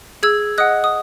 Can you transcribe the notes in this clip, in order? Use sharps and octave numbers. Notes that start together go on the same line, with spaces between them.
G#4 E6 G#6
D#5 F#5 D#6 F#6
D#6